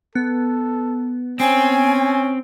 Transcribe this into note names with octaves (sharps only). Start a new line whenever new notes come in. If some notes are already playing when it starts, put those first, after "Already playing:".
B3 A4
C4 C#4 G#5